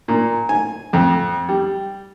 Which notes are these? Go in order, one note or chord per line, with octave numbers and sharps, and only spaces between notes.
A#2
G#5
F2
G3